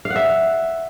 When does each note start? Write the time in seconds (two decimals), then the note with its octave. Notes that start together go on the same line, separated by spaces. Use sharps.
0.05 F5
0.10 F#5
0.16 E5